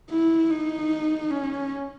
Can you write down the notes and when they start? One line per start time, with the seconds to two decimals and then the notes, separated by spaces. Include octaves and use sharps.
0.10 E4
0.50 D#4
1.30 C#4